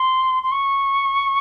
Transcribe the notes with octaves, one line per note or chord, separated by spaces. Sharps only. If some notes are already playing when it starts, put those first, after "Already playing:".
Already playing: C6
C6
C#6